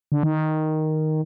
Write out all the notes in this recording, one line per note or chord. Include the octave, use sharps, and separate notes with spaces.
D3
D#3